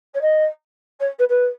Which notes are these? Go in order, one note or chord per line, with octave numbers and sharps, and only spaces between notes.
C#5
D#5
C#5
B4
B4